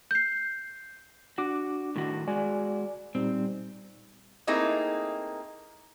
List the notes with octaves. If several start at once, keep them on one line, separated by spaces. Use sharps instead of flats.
G6 C7
D4 F#4 D6
A2 D#3 F#4
G#3 F#4 D5 G#5
A#2 G3 C4 D#4
A3 A#3 C4 D#4 E4 G#4